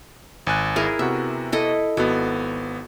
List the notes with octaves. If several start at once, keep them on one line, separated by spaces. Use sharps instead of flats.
G#1 G#5 F#6
E4 G#4 A#4
C3 B3 F#4 E5
E4 A4 D#5
G#1 B3 F#4 A4